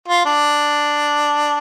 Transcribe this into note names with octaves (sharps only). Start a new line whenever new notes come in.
F4
D4